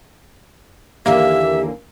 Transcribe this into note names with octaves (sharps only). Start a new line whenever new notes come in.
D#2 D3 E3 A#3 G4 E5